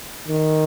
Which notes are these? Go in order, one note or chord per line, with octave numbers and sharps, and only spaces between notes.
D#3